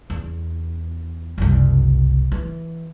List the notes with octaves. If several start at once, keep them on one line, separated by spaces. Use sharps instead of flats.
E2
F#1 C2
E3